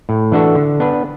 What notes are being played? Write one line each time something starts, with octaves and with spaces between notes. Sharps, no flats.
A2
E3 D4 F#4 A4
D3
B3 D4 B4